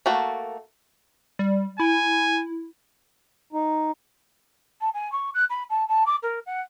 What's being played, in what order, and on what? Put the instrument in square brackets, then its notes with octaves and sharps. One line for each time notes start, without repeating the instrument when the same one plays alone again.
[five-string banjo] A3 A#3 F#4 A4
[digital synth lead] G3
[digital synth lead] E4 [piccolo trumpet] G#5
[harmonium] D#4
[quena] A5
G#5
C#6
F#6
B5
A5
A5
D6
A#4
F#5